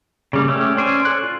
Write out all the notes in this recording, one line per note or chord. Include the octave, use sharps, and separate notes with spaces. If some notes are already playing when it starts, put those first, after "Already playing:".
C#3 G3 A#3
A3 C#4 G4
C#4 C5 D5 G#5
A4 F#6
F4